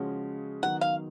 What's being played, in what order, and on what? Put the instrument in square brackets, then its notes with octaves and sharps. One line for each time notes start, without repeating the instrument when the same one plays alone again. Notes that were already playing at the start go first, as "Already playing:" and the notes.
Already playing: [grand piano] C#3 F3 G#3 C#4 F#4
[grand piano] D#3 F#3 B3 D#4 [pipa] F#5
[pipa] F5